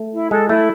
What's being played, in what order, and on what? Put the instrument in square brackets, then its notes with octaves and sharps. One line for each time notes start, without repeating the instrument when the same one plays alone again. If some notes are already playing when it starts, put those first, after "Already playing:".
Already playing: [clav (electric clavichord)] A3
[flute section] E4
[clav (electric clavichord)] G#3 [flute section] A4
[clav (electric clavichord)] A3 [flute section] E4